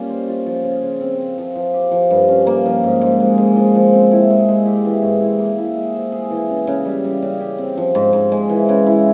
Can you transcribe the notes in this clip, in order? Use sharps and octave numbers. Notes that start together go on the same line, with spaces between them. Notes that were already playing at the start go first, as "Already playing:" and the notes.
Already playing: G3 A#3 C#4 F4
C5
F4
F3
C#3
C#3
C4
C4
F3
F3
G4
F3
G2
C#4
A#3
F3
G#2
G#2
G#3
G#3
F3
F3
C4
E4
G#3
G#3
G4
E3
G#2
E4
A#3
E4
G#3
C5
G#4
E3
C#3
C#3
G3
G3
C#3
G4
C4
F3
G#2
G#2
G#3
E3
C#3
E4